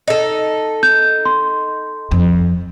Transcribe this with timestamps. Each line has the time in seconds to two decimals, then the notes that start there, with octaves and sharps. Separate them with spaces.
0.08 D#4 A4
0.83 G6
1.25 C6
2.11 F2